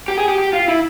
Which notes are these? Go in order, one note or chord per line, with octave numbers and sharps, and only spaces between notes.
G4
G#4
G4
G4
F4
E4